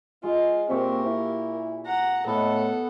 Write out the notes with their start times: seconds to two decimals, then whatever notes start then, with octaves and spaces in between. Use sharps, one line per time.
0.23 G#3 F4
0.70 A#2 C4 G4 A#4 E5 C#6
1.06 E4
1.86 F#5 A#5
2.27 A2 B3 A4 D#5 F#5